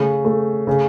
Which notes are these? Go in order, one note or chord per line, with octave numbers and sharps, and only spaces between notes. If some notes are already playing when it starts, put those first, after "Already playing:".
Already playing: C#3 A3
A3
C#3